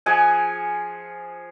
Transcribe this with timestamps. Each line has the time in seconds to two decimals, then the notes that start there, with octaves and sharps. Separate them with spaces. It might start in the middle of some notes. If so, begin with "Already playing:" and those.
0.06 F3 G#4 F#5 G#5